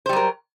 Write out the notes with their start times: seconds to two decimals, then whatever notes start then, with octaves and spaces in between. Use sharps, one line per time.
0.06 C5
0.09 G3
0.13 F#3
0.16 A#4